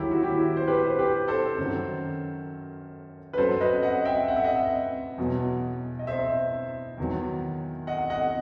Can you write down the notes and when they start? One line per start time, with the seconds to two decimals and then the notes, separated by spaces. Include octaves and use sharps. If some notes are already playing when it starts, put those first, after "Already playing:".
Already playing: D#2 D#3 F#3 E4 G4
0.11 F#4
0.23 E4 G4
0.57 C5
0.68 G4 B4
0.86 C5
0.99 G4 B4
1.28 A4 C5
1.58 F#2 D#3 F#3
3.33 B4
3.37 F#2 F#3 A4 C5
3.60 B4 D#5
3.83 D#5 F#5
4.05 E5 G5
4.28 F#5
4.36 E5
4.44 D#5 F#5
5.18 E2 B2 F#3
5.99 D#5
6.07 C5 E5
6.98 E2 D#3 F#3
7.87 D#5 F#5
8.10 D#5 F#5